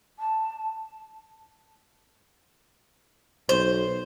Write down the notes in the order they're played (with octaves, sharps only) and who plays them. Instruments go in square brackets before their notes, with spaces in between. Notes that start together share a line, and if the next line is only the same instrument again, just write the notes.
[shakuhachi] A5
[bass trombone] B1 [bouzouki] C5